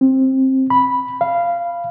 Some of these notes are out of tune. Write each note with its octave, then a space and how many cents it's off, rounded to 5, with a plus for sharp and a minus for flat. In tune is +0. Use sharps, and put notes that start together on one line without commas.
C4 +15
B5 -5
F5 -15